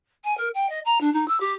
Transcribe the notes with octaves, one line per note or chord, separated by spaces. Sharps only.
G#5
A#4
G5
D#5
A#5
D4
D#4
E6
G4